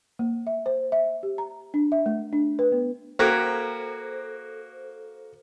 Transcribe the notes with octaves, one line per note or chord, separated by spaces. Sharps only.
A#3
E5
C5
E5
G4
A#5
D4
E5
A3
D4
B4
B3
A#3 F#4 A4 C5